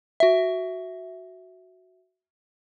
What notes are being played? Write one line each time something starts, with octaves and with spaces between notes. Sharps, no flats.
F#4 E5